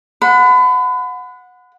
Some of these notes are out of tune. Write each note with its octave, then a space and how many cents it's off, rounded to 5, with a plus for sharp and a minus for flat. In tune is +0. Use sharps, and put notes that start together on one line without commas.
F#5 -20 B5 +35